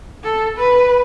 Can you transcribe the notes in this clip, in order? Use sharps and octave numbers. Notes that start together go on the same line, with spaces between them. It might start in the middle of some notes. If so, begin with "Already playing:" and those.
A4
B4